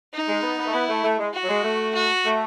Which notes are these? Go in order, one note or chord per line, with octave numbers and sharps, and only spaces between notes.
D#4
G#3
B3
B3
A3
B3 E4
A3
A3
G#3
F#4
F#3
G#3
A3
F#4
A3